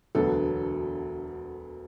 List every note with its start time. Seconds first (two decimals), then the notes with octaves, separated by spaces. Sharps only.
0.15 E1 D2 D3 F#3 B3 A4